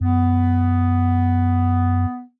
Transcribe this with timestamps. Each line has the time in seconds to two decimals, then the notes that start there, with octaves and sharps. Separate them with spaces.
0.01 F#2 B3